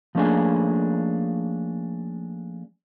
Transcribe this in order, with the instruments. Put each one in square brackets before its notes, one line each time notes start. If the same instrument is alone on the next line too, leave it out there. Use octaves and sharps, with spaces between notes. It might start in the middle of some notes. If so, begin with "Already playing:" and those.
[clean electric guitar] F3 A3 A#3 C#4 D4 G#4